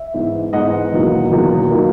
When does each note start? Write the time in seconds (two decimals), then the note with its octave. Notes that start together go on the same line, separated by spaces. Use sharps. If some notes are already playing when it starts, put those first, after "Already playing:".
Already playing: E5
0.14 G#2 E3 B3
0.53 G#2 E3 B3 D#5 F#5
0.92 E1 E2 D#3 F#3 A#3
1.31 E1 E2 D#3 F#3 A#3
1.70 D#3 F#3 A#3